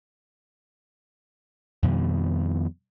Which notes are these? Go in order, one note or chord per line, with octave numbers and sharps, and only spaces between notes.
F2 B2 D#3 G3